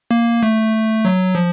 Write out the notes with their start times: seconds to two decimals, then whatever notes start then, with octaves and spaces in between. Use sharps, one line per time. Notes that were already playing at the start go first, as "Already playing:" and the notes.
0.11 A#3
0.43 A3
1.05 F#3
1.35 F3